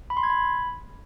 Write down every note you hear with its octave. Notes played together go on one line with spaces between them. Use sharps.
B5
C6
G#6
B5